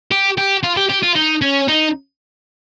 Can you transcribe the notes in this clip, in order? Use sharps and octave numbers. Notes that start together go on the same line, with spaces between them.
G4
G4
F4
G4
G4
F4
D#4
C#4
D#4